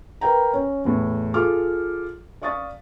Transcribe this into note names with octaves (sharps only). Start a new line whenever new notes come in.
A#4 B4 G5 A#5
C#4
E2 A2
F4 G#4 A4 D6 F6
D5 F5 C#6 D#6 A6